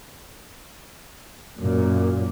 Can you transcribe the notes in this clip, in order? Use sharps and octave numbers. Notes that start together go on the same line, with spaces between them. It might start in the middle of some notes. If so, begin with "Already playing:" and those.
F#2 A#2